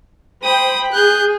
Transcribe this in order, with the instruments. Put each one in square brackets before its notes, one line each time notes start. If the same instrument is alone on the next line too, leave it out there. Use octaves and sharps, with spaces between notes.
[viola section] C5 G5 B5 [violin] D#6
[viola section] G#4 [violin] F#6 G6